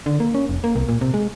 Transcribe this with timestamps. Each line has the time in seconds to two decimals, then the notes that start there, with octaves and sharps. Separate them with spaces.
0.06 D3
0.20 A#3
0.34 C#4
0.49 F1
0.64 A#3
0.75 C2
0.89 A#2
1.01 C3
1.14 G#3